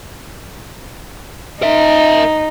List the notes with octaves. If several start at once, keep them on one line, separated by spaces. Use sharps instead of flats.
D#4 A#4 E5